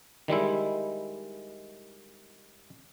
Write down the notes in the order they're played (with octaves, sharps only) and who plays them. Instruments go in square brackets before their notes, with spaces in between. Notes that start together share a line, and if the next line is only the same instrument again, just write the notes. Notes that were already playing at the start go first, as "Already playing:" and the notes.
[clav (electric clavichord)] D#3 G3 G#3 E4